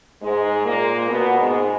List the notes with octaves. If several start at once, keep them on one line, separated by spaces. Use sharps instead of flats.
G#2 G#3
A#2 A#3
B2 B3
G#2 G#3